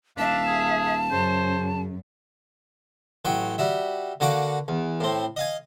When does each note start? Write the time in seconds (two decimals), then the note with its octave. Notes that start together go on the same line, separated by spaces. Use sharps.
0.18 D#1 D4 E5 F5 A5
0.47 G#4
1.12 F#2 C#3 C5
3.25 A1 F#3 G5 C#6
3.58 G3 F#4 E5
4.20 D3 A#3 F#4 F#5 C#6 D6
4.68 E2
5.00 A2 C4
5.36 D#5 F5 G#5